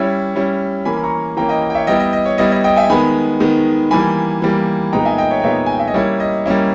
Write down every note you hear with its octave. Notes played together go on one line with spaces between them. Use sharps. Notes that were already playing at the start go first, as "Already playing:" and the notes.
Already playing: G3 C#4 E4 C#5 E5
G3 C#4 E4
E3 A#3 C#4 G#5 B5
B5
A#5 C#6
E3 A#3 C#4 G5 A#5
D#5 G5
D#5
G5
C#5 E5
G3 B3 E4 D#5 G5
D#5
D#5
C#5
G3 B3 E4 D#5
D#5
D#5 G5
E5 G#5
D#3 G#3 B3 G#5 B5
D#3 G#3 B3
E3 G3 A#3 G#5 B5
E3 G3 A#3
A#2 G#3 B3 D#4 G5 A#5
E5 G#5
D#5 G5
C#5 E5
G5
A#2 G#3 B3 D#4 C#5 E5
G#5
G5
E5
D#5
G3 A#3 C#4 E4 C#5
D#5
G3 A#3 C#4 E4